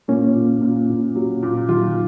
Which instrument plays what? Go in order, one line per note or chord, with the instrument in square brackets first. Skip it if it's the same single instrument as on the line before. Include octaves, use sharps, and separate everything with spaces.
[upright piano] A#2 [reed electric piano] A#3 C#4
[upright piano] A#2
A#2
A#2
F#3
A#2
[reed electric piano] D#3 F#3 [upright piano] F4